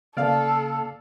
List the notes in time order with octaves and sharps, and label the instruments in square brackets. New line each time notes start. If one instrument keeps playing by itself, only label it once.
[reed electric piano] C#3 A#3 F6 [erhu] A4 [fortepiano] D5 F5